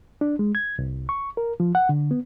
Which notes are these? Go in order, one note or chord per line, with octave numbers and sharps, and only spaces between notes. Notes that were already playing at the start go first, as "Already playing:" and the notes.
D4
G#3
G#6
C2
C#6
A#4
F3
F#5
D3
B3